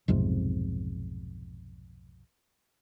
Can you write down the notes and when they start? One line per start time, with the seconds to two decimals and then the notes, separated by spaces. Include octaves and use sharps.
0.08 B1 F2 G#2 C3